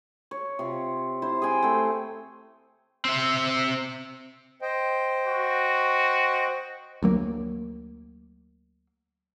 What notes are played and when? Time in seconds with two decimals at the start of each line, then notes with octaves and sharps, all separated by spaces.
0.31 C#5
0.59 C3 F4
1.22 E4 C5
1.42 G#4 G5 G#5
1.62 A3 C4
3.05 C4 E5
4.62 C5 D#5 G5
5.28 F#4
7.03 D2 F#3 A#3